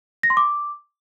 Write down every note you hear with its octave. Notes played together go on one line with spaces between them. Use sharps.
A#6
C6
D6